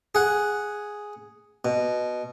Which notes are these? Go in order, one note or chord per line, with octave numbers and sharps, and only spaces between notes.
G#4 F#5
B2